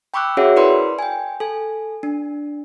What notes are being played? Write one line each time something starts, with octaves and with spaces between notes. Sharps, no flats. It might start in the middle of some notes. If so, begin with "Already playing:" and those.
G5 B5 C#6 D6 E6 F#6
C#4 F#4 G#4 C#5 E5 F#5
E4 A#4 B4 D5 B5 C6
G5 G#5
A4 G#5
D4